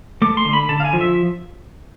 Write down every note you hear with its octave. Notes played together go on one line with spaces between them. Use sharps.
A3 D6
C6
D3
B5
D3 A5
F5
G#5
F3
E5